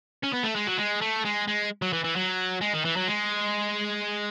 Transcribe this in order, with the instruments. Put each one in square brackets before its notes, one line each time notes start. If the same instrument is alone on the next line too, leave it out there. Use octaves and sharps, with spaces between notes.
[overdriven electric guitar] C#4
B3
A3
G#3
F#3
G#3
A3
G#3
G#3
F#3
E3
E3
F#3
G#3
D#3
E3
F#3
G#3